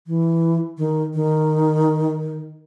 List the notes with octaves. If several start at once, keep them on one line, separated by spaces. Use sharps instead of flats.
E3
D#3
D#3